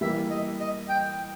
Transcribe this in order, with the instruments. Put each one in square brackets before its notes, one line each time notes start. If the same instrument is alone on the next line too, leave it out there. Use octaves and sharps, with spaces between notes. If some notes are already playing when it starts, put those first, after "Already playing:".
[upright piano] E3 G3 A#3 [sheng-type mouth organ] E5
[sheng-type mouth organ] D#5
D#5
G5